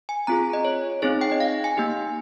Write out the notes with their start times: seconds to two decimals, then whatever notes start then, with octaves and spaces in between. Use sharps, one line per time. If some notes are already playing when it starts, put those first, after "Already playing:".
0.09 G#5
0.27 C4 F4 G#4 A#5
0.53 D#5
0.65 C#5
1.02 C4 D#4 G#4 C#5
1.21 G5
1.32 D#5
1.40 F5
1.64 G#5
1.77 A#3 D#4 G4